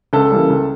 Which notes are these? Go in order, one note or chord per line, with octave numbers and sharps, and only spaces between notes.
C#2 A4
C#3 E3 G3 A#3
C#2